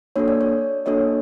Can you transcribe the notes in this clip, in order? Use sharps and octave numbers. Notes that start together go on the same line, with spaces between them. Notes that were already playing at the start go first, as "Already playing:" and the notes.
A#3 D4 F#4 A4 C#5
D5
C#5
A#3 D4 F#4 A4 C#5 D#5